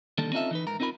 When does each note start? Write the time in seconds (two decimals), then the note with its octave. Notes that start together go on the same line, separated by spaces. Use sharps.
0.18 D3 D#3 G3 A#3 A4
0.32 C4 C#4 D#4 F4 A4 E5
0.51 E3 D#4 B4
0.67 G#2 A#4 A#5
0.80 C4 D#4 F4 A#4 B5